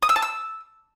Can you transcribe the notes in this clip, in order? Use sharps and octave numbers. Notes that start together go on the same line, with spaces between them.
D#6
E6
A5
E6